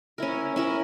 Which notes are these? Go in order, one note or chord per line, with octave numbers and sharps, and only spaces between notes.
C#4 E4 A#4
C#4 E4 A#4